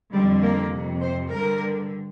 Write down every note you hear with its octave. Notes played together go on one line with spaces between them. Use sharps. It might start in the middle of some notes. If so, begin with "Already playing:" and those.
F2 D3 G3
A#3
F2 C3
C5
G2 D3 A#4